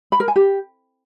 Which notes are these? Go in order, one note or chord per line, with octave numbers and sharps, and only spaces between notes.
B5
A#4
G#5
G4